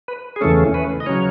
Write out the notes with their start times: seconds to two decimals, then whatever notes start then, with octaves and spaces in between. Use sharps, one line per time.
0.08 B4
0.36 G#4
0.41 E2 C#3 E3 A3 C#4 A4
0.74 B4
1.00 D#5
1.06 C#3 F#3 C#4 C#5